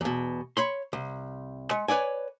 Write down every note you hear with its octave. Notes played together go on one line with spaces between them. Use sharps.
E2 B2
C#5 B5 C6
C2
G#3
B4 C#5 D5 G#5